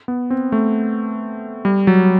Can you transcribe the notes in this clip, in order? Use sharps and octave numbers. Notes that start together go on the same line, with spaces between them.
B3
C4
A3
G3
F#3